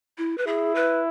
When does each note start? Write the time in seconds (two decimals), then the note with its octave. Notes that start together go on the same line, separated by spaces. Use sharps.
0.18 E4
0.38 B4
0.47 E4 G#4
0.75 B4